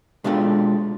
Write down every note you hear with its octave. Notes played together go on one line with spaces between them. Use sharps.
B2 G#3 D4 F4 G4 A4